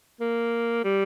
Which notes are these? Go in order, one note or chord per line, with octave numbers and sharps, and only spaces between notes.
A#3
G3